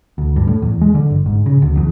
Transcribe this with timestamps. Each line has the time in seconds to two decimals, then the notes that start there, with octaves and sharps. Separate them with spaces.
0.18 D2
0.36 G2
0.47 A2
0.62 E2
0.81 G#3
0.95 D3
1.10 G1
1.26 G#2
1.46 C#3
1.62 D2
1.77 E2